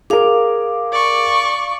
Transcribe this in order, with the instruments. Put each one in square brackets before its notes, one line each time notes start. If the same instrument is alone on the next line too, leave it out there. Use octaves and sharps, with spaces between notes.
[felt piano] G#4 A#4 [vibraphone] F5 D6
[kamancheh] D5 C#6